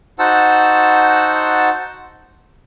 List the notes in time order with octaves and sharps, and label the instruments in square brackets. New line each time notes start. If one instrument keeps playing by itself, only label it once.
[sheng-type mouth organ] D#4 F#4 C5 F#5 A5 E6